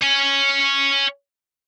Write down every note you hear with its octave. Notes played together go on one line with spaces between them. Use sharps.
C#5 G#5